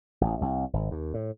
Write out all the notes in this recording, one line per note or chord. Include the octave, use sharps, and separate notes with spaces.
A1
C2
G#1
D#2
A2